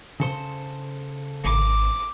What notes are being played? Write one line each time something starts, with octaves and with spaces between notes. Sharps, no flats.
C#3 A4 C5
G#1 D6